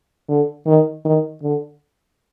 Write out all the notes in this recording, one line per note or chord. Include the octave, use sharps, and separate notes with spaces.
D3
D#3
D#3
D3